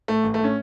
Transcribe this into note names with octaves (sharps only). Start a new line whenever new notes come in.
A2 A3
A1
A3
A2 C#4